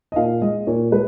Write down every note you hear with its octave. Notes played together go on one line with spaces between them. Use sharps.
D#5
A#2 F5
G#3 D#5
A#2 C#5
G#3 B4